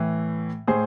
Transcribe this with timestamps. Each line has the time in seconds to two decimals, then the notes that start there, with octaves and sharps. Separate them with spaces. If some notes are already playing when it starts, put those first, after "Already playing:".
Already playing: A2 E3
0.67 A2 G#4 C5